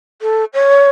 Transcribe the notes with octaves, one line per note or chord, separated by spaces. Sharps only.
A4
C#5